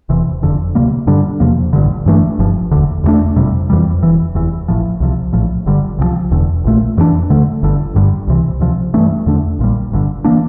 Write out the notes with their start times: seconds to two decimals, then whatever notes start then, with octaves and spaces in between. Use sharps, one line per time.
0.09 E1 E2 C3 E3
0.42 F1 F2 D3
0.75 D2 C3 G3 A#3
1.07 G2 D3 G3 D4
1.40 E2 C3 F3 A#3
1.73 A1 G2 D3
2.06 G2 E3 A3 D4
2.39 G1 G2 F3
2.71 E1 D2 D3
3.04 E2 D3 A3 D4
3.36 G1 F2 C3 G3
3.70 F2 E3 G3
4.03 E1 E2 E3
4.35 F1 E2 E3
4.68 A1 A2 F3
5.00 C2 C3 F3
5.33 A#1 A2 F3
5.66 G1 G2 D3 G3
5.99 C2 C3 F3
6.31 E1 E2 D3
6.64 A#1 A#2 A3
6.97 F2 E3 A#3 D4
7.30 D2 D3 A3
7.63 G1 G2 D3
7.95 G1 G2 D3 G3
8.28 C2 C3 E3
8.60 D2 C3 F3
8.94 G2 E3 A3 D4
9.26 E2 D3 A3 D4
9.59 A#1 A#2 G3
9.92 G1 G2 D3
10.24 E3 A#3 D4